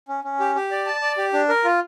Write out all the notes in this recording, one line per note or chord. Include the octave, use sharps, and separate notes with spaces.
C#4
C#4
G4
G4
D5
A5
D5
G4
D4
A#4
F4